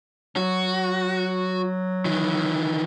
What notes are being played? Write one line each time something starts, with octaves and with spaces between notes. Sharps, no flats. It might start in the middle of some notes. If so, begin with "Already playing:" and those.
F#3 F#4
D#3 E3